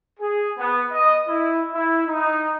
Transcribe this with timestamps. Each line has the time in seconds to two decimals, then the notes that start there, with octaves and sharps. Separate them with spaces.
0.19 G#4
0.58 B3
0.91 D#5
1.28 E4
1.74 E4
2.07 D#4